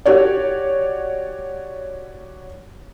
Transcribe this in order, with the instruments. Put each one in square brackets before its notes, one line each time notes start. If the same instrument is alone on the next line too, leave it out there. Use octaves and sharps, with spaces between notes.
[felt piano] F#4 G4 C#5 D5